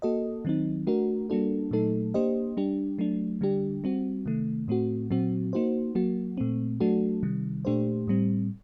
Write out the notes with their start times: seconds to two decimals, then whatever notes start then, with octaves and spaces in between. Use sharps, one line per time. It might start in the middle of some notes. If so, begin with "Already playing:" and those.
0.02 A#3 F#4 A4 D#5
0.45 D#3 F#3 C4 D#4
0.87 A3 D4 F#4 A#4
1.30 G3 A#3 D4 F#4 A4
1.71 A#2 F#3 A3 D#4 A4
2.14 A#3 D4 G4 C5 D#5
2.57 G3 D4 G4
2.99 F#3 A3 D4
3.41 D3 G3 D4 G4
3.84 G3 C4 F#4
4.26 C3 D#3 A3
4.68 A2 A3 C4 F#4
5.11 A#2 F#3 C4 F#4
5.53 A#3 D#4 F#4 C5
5.95 F#3 A#3 F#4
6.37 A#2 A3 C4
6.80 F#3 A3 D4 F#4 A4
7.23 C3 D#3 G3
7.65 A#2 A3 D4 G4 C5
8.08 A2 G3 C4